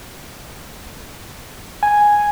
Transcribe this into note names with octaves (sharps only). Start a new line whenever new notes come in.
G#5